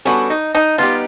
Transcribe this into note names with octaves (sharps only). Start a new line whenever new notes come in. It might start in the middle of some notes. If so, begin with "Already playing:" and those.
G3 B3 C#4 D4 F#4 A4
D#4
D#4
G3 B3 D#4 F4 G4